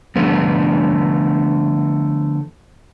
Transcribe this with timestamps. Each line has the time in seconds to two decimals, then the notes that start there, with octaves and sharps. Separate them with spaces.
0.16 D3 F3 A3 B3